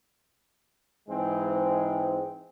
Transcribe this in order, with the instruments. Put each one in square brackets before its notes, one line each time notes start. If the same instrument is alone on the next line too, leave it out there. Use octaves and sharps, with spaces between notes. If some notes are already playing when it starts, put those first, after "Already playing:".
[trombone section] G#2 E3 G#3 C4